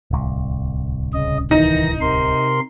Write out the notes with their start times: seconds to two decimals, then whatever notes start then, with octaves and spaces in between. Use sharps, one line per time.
0.11 D1 C2
1.14 C#3 D#5
1.51 D#3 E3 D#4 A#6
2.01 C3 A#4 C6